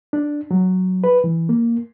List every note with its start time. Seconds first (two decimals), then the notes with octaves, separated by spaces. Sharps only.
0.13 D4
0.51 F#3
1.04 B4
1.24 E3
1.49 A#3